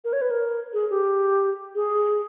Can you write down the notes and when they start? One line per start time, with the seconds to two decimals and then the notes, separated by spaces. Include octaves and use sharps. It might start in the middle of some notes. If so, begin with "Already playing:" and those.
0.04 A#4
0.13 C#5
0.21 B4
0.30 A#4
0.73 G#4
0.90 G4
1.75 G#4